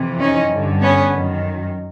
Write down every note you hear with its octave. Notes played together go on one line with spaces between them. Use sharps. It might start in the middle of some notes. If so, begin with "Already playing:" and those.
Already playing: F2 C3 E3
C#4 D#4
G2 D3
B3 C#4
F#2 D#3